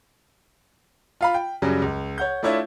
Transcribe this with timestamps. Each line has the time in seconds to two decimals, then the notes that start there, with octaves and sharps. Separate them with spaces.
1.21 F4 F5 B5
1.34 G5
1.62 F#2 C#3 F#3 G3
1.82 C#2
2.18 C#5 F#5 G6
2.43 A3 D4 E4 F4 C#5 E5